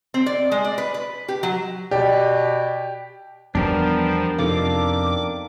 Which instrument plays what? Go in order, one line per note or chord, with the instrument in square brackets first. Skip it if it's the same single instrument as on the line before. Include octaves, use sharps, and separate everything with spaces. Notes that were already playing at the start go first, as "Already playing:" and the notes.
[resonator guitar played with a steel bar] C4
D5
G#3
D5
B4
B4
G4
F#3
[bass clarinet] B2 [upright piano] G4 [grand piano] D5
[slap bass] E2 G3 [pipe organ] F3 [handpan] B3 [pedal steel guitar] D4 G4 A#4
[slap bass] F2 C3 [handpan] D#4 A4 F5 [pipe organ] D6